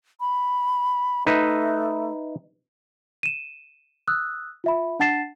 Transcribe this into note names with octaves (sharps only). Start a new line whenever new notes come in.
B5
A3 D#4 B4 E5
D#7 E7
D#6 E6 F#6
F4 E5 B5
D4 F#5 A5 A6 C7 E7